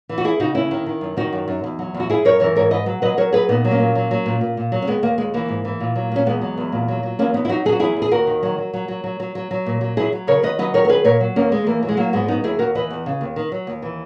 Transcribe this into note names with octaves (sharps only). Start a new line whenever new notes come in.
E3
F#4
D#2 E4 G#4
C#3 D#4 F#4
D#2 C#4 E4
D#3
D#3
F#2
D#3 D#4 F#4
F#2
F#2
E2
F#3
E2
F#4
F#2 E4 G#4
F#2 A#4 C#5
E3 A#4 C#5
G#2 A#4 C#5
G#2 B4 D#5
F#3
F#3 B4 D#5
F#3 A#4 C#5
F#3 G#4 B4
A#2 B3 D#4
F#3
A#3 C#4
A#2
F#3
F#3
A#2
A#2
A#2
F#3
C#4
D#2 G#3 B3
D#2 A#3
D#2 G#3
E3 A#3
G#2
E3
A#2
F#3
A#2 C#4
E2 G#3 B3
F#3
E2
A#2
F#3
F#3
E2 A#3 C#4
E2 B3 D#4
E4
F#3 D#4 F#4
F#3 G#4
F#4
E2 E4 G#4
E2
G#4
D#2 F#4 A#4
D#3
F#3
F#3
F#3
F#3
F#3
F#3
F#3
F#3
A#2
F#3
F#3 E4 G#4
F#3
C#3 A#4 C#5
D#3 B4 D#5
F#3 B4 D#5
D#3 A#4 C#5
A#4
F#3 G#4 B4
A#2 A#4 C#5
F#3
D#2 A#3 C#4
D#2 G#3
E3 A#3
F#3
G#3
F#3 A#3
G#2 G#3 B3
F#3 B3 D#4
D#2 E4 G#4
D#2 F#4 A#4
E3 B4 D#5
E2
C#3
D#2
D#3
F#3
D#2
E3